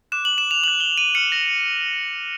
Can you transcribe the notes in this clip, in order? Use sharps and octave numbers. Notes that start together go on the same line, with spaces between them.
D6 F#6 E7
F#7
E7
F7
D6 F#6 F#7
G7
D#7
D6 F6 C#7
A#6